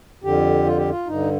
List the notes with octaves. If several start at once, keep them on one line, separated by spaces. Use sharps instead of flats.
F2 D3 G4
F4
G4
F4
G2 D3 D#4